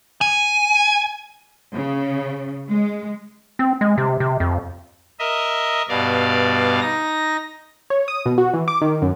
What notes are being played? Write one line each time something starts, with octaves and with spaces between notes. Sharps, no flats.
G#5
C#3
G#3
C4
G#3
C3
C3
F2
A#4 D#5 E5
G2 B2 D5 F5
D#4 A#6
C#5
D#6
B2
F#4
E3
D6
D#3
F#2